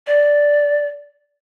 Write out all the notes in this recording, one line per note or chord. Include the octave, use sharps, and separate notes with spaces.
D5